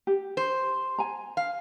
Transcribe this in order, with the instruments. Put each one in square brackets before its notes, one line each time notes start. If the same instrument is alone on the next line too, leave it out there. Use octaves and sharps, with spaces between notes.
[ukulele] G4
[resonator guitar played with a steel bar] C5
[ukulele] G#5 A#5
[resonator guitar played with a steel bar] F5